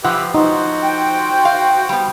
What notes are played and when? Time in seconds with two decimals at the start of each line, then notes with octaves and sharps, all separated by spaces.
0.04 F3 G4 B4 E5 F#5
0.34 D#4 F#4 C5
0.83 G5
1.45 F5
1.89 G3 B3